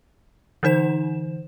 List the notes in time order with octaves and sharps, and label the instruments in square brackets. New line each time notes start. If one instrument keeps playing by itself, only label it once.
[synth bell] D3 E3 D#4 C5 E7